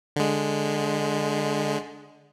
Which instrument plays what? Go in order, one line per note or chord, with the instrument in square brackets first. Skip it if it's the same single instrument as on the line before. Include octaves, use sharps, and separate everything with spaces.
[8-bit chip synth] D3 G#3